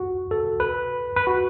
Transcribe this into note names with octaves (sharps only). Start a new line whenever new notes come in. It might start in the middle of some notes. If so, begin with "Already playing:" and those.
Already playing: F#4
A4
B4
B4
F#4